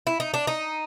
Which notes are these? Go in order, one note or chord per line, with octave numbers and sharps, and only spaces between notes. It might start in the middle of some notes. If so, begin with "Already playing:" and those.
E4
D#4
D4
D#4